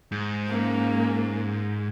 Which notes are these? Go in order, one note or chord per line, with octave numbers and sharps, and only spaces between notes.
G#2
A#3 C#4